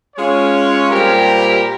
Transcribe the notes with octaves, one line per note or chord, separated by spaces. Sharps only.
G#3 C#4 F4 G#4 C#5
A#2 G3 C4 G4 A#4